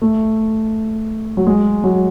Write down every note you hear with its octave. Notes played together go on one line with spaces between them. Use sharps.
A3
F#3
G#3
F#3